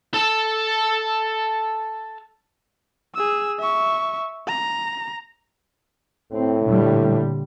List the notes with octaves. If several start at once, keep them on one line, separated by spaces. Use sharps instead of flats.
A4 A5
G#4 E6
E5 C#6
A#5
A2 C4
A#2 D3 G3